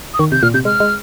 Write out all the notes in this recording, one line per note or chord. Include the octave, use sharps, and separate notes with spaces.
D#6
D#3 C#6
C3 G6
A#2 F6
C3 G6
G#3 F6
G#3